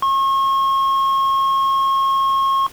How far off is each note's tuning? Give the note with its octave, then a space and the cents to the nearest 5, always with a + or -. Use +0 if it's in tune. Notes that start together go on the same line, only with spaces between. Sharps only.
C#6 -40